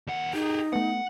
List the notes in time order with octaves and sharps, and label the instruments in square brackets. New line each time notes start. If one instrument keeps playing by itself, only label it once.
[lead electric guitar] D#2 F#5
[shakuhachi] D#4 [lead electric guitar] G4 G#4 [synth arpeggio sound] A#5
[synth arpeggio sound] A3 B3 [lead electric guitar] F#5